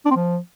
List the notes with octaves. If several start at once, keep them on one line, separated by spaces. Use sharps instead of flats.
D4
C4
F3